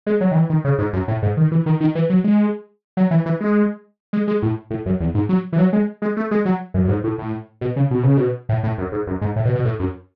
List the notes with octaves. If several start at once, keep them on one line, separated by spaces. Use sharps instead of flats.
G#3
F#3
D#3
E3
D#3
C#3
G#2
F#2
A2
G#2
D#3
E3
D#3
D#3
E3
F#3
G#3
F#3
E3
E3
G#3
G#3
G#3
A2
A2
F#2
E2
G#2
F#3
E3
F#3
G#3
G#3
A3
G#3
F#3
F#2
F#2
G#2
A2
A2
B2
C#3
B2
C#3
B2
A2
A2
F#2
G#2
F#2
G#2
A2
B2
B2
A2
F#2